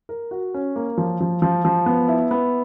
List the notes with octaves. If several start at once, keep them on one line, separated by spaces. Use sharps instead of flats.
A#4
F#4
C#4
A#3
F3
F3
F3
F3
B3
E4
B3